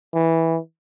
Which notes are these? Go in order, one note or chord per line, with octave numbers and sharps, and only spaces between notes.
E3